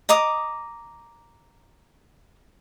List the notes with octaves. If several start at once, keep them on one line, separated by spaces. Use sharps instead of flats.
D#5 A#5 D6 D#6